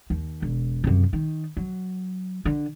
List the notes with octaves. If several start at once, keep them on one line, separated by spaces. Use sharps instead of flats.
D#2
E1
F#2 C3
D#3
F#3
D3